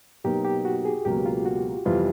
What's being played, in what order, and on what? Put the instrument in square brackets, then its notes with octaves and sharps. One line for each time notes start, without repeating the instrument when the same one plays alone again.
[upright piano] B2 F#3 A#3 D#4 [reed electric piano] G4
[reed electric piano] G4
F#4
G#4
[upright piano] C#2 B2 F#3 A#3 [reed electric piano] G4
[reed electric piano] F4
F#4
[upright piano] F2 C3 E3 G3 B3 [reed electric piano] F4